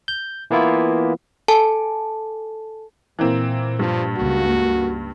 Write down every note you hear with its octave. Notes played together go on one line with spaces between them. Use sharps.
G6
E3 A#3 B3 E4 F4
A4 G#5 A5
A#2 E3 A#3 C4
G2 F3
C#2 A#3 F#4